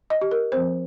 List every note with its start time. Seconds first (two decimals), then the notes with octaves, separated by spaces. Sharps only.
0.10 D#5
0.21 G4
0.31 A#4
0.52 F3 C4 C5